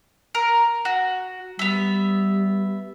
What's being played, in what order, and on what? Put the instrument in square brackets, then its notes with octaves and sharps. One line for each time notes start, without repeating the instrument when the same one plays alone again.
[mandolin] A#4
F#4
[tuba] G3 [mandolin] B3 E5